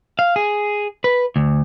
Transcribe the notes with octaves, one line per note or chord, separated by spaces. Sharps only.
F5
G#4
B4
D2